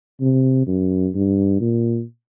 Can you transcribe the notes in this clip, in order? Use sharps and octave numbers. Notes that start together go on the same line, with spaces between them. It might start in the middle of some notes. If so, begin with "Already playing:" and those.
C3
F#2
G2
A#2